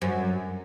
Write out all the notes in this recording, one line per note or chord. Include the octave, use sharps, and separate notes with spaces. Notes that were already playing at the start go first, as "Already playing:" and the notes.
F#2